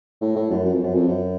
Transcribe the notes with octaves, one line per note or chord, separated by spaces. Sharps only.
A2
A2
F#2
F#2
F2
F#2
F2
F#2